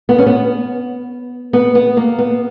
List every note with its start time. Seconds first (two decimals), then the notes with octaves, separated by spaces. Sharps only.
0.09 B3
0.18 C#4
0.26 B3
1.53 B3
1.75 B3
1.97 A#3
2.19 B3